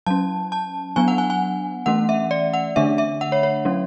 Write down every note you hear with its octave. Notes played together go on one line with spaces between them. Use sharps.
F#3 C#4 A5
A5
F#3 B3 D4 G#5
F#5
G#5
G#5
E3 A3 C#4 F#5
E5
D5
F#5
D3 A3 D4 E5
E5
F#5
C#5
C#5
F#3 C#4